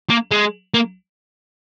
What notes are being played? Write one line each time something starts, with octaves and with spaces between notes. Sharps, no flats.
A#3
G#3
A#3